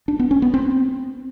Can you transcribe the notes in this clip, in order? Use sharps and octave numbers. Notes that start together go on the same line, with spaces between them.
D4
B3
C#4
B3
C4